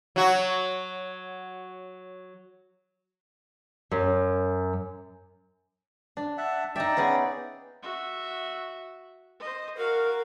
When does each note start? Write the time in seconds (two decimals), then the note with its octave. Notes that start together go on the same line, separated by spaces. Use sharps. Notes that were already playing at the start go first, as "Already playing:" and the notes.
0.16 F#3 F#4
3.92 F#2
6.17 D4
6.38 E5 F#5 A5
6.76 D#4 D5 E5 G5
6.97 B3 C#4 G#4
7.83 F#4 E5
9.40 C5 D#5
9.77 F#4 A#4 F5